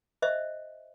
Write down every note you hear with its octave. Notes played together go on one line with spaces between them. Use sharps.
C5 D#5 E5